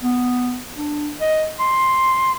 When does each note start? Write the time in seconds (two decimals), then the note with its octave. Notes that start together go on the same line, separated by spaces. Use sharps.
0.02 B3
0.77 D4
1.21 D#5
1.60 C6